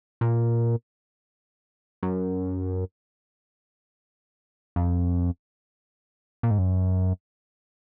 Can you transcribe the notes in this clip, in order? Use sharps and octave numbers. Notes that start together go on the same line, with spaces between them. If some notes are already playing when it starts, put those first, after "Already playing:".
A#2
F#2
F2
A#2
G#2
F#2